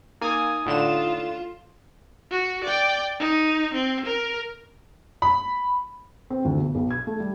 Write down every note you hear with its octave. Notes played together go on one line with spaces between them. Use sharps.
A#3 D#4 G#5 D#6
A2 D3 F4 E7
F#4
D5 G5
D#4
C4
A#4
B5
C4
D2
B1
B1
G#6
A3
G3